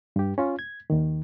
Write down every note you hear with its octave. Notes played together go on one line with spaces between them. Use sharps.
G2 G4
C#4 F4
G#6
D#2 D#3